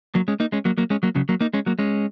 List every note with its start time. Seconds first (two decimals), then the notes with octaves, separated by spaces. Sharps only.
0.15 F#3 A#3
0.28 G#3 C#4
0.40 A#3 D#4
0.52 G#3 C#4
0.65 F#3 A#3
0.78 F#3 A#3
0.90 G#3 C#4
1.03 F#3 A#3
1.15 C#3 F#3
1.29 F#3 A#3
1.41 A#3 D#4
1.54 G#3 C#4
1.66 F#3 A#3
1.79 G#3 C#4